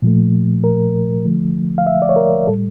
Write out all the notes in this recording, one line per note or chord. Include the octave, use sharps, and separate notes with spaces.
A#2 F3 A3
A#4
D3 F3 A3
F5
E5
D5
C#5
A#4
A2 G3 A4